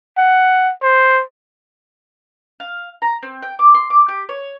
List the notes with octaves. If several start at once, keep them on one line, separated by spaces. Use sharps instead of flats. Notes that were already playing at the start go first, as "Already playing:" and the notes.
F#5
C5
F5
A#5
C4
G5
D6
C6
D6
G4
C#5